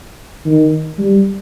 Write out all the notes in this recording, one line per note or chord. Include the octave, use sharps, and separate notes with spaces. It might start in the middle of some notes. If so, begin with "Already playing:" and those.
D#3
G3